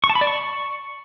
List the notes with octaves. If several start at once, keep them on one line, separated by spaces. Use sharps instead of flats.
C#6
A5
B5
D5
C#6